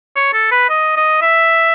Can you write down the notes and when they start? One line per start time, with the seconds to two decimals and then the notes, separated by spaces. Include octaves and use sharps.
0.16 C#5
0.33 A4
0.52 B4
0.70 D#5
0.96 D#5
1.22 E5